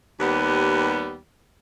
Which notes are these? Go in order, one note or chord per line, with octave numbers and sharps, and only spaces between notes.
D#2 G3 B3